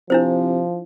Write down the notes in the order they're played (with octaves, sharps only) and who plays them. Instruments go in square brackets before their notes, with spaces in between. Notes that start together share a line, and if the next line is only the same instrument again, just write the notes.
[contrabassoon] C3 [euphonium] F3 [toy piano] D4 E4 C5